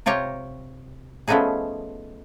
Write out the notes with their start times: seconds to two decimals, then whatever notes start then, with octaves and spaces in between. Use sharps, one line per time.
0.06 C3 F4 G4 C#5 A#5
1.28 F3 A3 B3 C#4 D#4 G#4